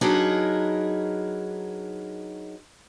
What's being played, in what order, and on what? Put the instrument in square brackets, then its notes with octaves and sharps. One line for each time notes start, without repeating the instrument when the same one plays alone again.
[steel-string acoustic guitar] F#3 D4 D#4 G#4 A#4 B4